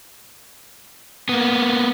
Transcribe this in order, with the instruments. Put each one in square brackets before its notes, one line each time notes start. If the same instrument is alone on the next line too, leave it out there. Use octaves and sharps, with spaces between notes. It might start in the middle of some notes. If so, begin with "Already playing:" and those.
[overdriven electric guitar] A#3 B3